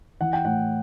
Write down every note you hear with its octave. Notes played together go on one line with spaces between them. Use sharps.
E3 F#5
G5
A2 F#5